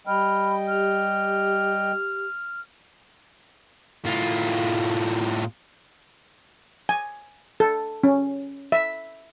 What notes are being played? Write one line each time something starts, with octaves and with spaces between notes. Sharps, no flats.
G3 D#5 G5 B5 F6
G4 F6
A2 F4
G#5
A4
C#4
E5